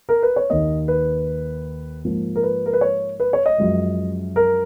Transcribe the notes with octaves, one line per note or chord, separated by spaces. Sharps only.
A#4
B4
C#5
D#2 D#3 A#3 D#5
B4
G#2 F3 A#3
A#4
B4
A#4
B4
C#5
B4
C#5
D#5
F#2 F3 G#3
A#4